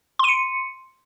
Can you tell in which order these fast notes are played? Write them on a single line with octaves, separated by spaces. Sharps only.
C6 D#7 C#7